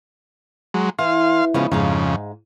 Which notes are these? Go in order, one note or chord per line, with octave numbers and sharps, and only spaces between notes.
F#3 G#3
E3 F5 C6
C#3 F3 G#3 B3
F2 G#2 C#3 G#4 F5